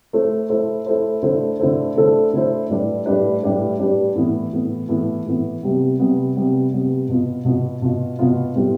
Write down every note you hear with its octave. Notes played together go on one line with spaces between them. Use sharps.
A3 E4 A4 C5
A3 E4 A4 C5
A3 E4 A4 C5
D3 A3 E4 A4 C5
D3 A3 E4 A4 C5
D3 A3 E4 A4 C5
D3 A3 E4 A4 C5
A2 G3 D4 G4 B4
A2 G3 D4 G4 B4
A2 G3 D4 G4 B4
A2 G3 D4 G4 B4
A2 E3 B3
A2 E3 B3
A2 E3 B3
A2 E3 B3
C3 G3 B3
C3 G3 B3
C3 G3 B3
C3 G3 B3
B2 B3 F4
B2 B3 F4
B2 B3 F4
B2 B3 F4
A2 G3 B3 F4